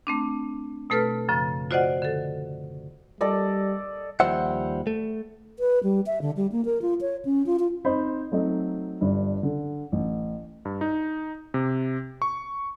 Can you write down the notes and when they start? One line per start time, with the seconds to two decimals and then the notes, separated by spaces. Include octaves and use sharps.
0.07 A3 C4 D4
0.90 B2 A3 A4 B4 F6
1.29 F#2 C#3 F3
1.71 F4 F#4 C5 D5 D#5 F#5
2.02 D3 A4
3.21 G3 A4 D5 D#5
4.20 D#2 F3 G3 C5 E5 F#5
4.87 A3
5.59 B4
5.83 G3
6.06 E5
6.22 D3
6.37 G3
6.52 A#3
6.65 A#4
6.82 F4
7.01 C#5
7.25 C#4
7.46 F4
7.59 F4
7.85 C4 D#4 C5 B5
8.32 F#3 A3 C4 D#4
9.01 G1 G2
9.43 D3
9.92 A1
10.65 G2
10.81 D#4
11.54 C3
12.22 C#6